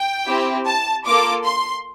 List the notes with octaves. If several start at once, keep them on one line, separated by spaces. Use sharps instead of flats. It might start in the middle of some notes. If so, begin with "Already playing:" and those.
Already playing: G5
C4 E4 G4
A5
A#3 F4 A4 D6
C6